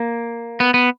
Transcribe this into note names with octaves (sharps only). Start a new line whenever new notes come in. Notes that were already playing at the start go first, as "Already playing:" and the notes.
Already playing: A#3
B3
B3